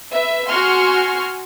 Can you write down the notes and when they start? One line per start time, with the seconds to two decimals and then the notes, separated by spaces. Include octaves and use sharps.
0.12 B4 E5
0.48 F#4 G#5 C6 C#6 F6